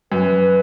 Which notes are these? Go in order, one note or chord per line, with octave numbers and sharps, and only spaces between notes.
F#2 B4